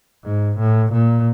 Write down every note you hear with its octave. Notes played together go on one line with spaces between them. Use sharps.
G#2
A2
A#2